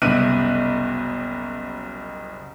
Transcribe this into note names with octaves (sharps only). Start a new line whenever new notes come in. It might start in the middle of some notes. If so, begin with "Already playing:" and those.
F#1 C2 B2 E5 F#6 D#7